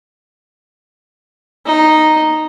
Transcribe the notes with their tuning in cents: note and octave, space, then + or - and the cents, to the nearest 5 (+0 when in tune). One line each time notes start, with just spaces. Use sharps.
D#4 -5